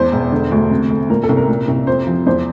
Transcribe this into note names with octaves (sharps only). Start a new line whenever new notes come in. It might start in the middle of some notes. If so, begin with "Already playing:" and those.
Already playing: E2 C5
E1
D3
D2
C3
A3
A#2 A#4
A4
C2
A#4
A#2
C2
F2 C5
F3
E2 C5